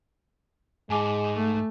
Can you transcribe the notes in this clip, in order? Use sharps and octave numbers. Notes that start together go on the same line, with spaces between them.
G#2 G#3 G#5 A5 D6
A3